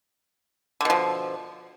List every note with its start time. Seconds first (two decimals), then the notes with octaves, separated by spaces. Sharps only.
0.81 D3
0.85 B2
0.90 F3